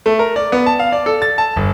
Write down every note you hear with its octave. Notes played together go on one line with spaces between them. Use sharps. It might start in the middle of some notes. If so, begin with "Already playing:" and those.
A3
A#4
D5
B3
A5
F5
D5
A4
A6
A5
G1